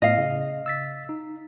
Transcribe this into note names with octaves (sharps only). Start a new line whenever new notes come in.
A2 B3 D#5 F5
C#3
E6 A6 B6
D#4